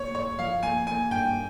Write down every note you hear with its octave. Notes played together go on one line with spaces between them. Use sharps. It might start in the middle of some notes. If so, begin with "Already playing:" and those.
Already playing: A#3 C#5
G2 C#5
F3 F5
A#3 G#5
A#3 G#5
G2 G5